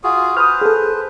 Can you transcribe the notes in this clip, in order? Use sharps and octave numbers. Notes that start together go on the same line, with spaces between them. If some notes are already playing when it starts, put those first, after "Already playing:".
F4 F#4 G#4
B4 C5 D#6 F6
G#4 A4